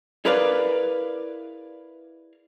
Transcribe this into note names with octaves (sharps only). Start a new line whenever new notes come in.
E4 G#4 A#4 B4 D5 F5